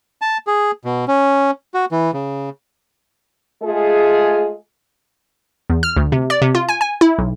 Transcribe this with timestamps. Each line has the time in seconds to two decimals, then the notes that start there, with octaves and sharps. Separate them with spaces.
0.22 A5
0.47 G#4
0.85 B2
1.08 C#4
1.74 F#4
1.92 E3
2.14 C#3
3.63 G#3 A3 F4 G#4
5.70 E2
5.83 F6
5.97 D2
6.12 C3
6.30 D5
6.42 C3
6.55 F4
6.69 G#5
6.81 G#5
7.01 E4
7.19 B1